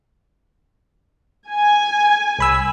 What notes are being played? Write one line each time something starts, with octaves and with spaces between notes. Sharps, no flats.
G#5
C2 B5 E6